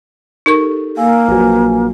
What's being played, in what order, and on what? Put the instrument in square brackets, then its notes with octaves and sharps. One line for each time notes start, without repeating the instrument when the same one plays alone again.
[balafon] D#4 A#4 C#6 [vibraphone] G4 A4
[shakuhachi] A#3 [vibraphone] F5 G#5 E6
[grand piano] A#1 F#3 [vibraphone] B4 G#5